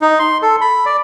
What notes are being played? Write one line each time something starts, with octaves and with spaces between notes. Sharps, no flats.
D#4
C6
A4
B5
D5